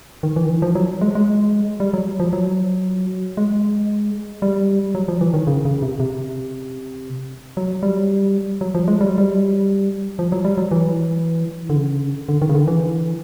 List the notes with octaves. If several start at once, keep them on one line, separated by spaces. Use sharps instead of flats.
D#3
E3
D#3
E3
F3
F#3
G#3
G#3
G3
F#3
F3
F#3
G#3
G3
F#3
F3
E3
D#3
C#3
C#3
C3
C3
F#3
G3
F#3
F3
G#3
G3
F#3
G3
F3
F#3
G3
F#3
E3
D3
C#3
D3
D#3
C#3
D3
E3